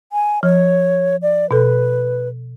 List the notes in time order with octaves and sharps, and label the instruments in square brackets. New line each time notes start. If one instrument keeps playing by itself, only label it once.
[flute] G#5
[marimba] F3 [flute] C#5
[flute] D5
[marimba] B2 A4 [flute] B4